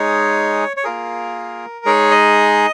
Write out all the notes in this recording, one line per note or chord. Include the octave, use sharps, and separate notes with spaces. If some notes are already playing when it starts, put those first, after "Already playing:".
Already playing: G#3 D#4 G#4 C#5
C#5
A#3 F4 G#4 A#4
G#3 D#4 G#4 C#5
D#5